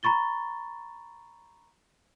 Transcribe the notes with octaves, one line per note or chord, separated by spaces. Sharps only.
A#5 B5 C#6 A6 G7